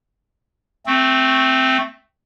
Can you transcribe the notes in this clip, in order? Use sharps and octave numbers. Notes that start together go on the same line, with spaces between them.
A3 C4